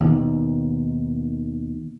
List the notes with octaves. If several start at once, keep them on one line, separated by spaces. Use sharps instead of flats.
D#2 B2 D#3